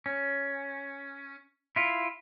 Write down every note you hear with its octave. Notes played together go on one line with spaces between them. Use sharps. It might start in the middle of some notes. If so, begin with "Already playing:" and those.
C#4
E4 F4